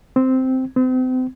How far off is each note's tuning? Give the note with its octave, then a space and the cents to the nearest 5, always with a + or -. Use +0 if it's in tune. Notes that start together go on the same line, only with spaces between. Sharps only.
C4 -5
C4 -35